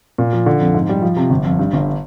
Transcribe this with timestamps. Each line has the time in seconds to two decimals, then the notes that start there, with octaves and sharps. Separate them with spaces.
0.18 A#2
0.33 F3
0.46 D3
0.60 F2
0.74 G#2
0.89 G3
1.02 F3
1.16 C3
1.30 G1
1.44 F2
1.59 G2
1.73 G1